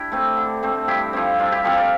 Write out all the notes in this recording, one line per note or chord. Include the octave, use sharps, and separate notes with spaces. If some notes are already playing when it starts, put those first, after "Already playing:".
Already playing: D4 E4 G4
A3 C4
D3
A3 C4
G2 E4 G4
F3 C4
G2 D4 F4
E4 G4
F3 C4 F4 A4
A#4 D5